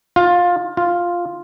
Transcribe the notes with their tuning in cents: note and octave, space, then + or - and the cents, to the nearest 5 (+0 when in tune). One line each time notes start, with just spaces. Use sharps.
F4 +15
F4 +0